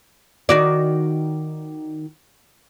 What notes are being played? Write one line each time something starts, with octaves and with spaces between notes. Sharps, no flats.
D#3 F#4 D5